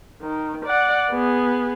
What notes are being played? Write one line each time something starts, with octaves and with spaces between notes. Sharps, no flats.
D#3
D5 F#5
B3 G#4